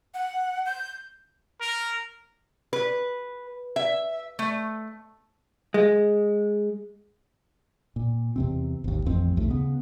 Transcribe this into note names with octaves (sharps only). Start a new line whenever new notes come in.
F#5
G6
A#4
B4
E5
A3
G#3
A#2
E2 C3 C4
G#1 D#2
A1 F2 F3 C4
A#1 D#2 A3
C#3 B3